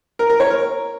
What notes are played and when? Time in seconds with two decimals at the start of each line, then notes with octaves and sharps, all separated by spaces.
0.19 A#4
0.30 A#4
0.40 C#5
0.50 A#4